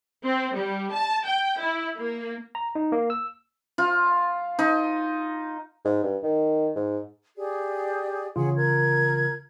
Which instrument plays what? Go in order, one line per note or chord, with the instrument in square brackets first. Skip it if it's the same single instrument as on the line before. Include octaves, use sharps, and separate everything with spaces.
[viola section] C4
G3
A5
G5
E4
A#3
[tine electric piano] A#5
D#4
A#3
E6
[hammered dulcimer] F4
D#4
[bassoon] G#2
G2
D#3
G#2
[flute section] G4 G#4 D5
[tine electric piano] C#3 E3 F4 [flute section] G#4 C#5 F#5
[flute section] A#4 G#6